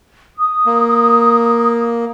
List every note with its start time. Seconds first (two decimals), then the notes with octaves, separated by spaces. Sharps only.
0.38 D#6
0.66 A#3